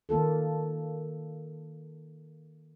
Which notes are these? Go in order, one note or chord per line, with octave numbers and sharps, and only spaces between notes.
D#3 A#3 F4 A4